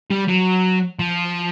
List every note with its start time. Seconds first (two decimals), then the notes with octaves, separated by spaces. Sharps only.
0.10 G3
0.28 F#3
0.99 F3